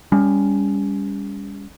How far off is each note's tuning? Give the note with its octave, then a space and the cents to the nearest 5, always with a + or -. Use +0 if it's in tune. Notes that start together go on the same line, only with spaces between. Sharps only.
G3 +35 C#4 +25